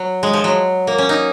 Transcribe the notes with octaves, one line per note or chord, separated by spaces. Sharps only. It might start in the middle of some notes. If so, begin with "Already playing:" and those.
Already playing: F#3
G#3
F3
F#3
A#3
C#4
D#4